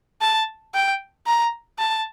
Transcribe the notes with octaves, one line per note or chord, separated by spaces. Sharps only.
A5
G5
A#5
A5